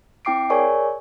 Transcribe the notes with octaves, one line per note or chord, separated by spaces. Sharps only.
C4 E4 G5 D6 C7 D7
G#4 A#4 C#5 D5 G#5 C#6